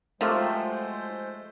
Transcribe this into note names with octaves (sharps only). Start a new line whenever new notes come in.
F3 F#3 G#3 A3 F4 G4 C5